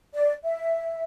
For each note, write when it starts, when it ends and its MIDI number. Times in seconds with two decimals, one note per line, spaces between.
0.13 0.32 74
0.43 1.03 76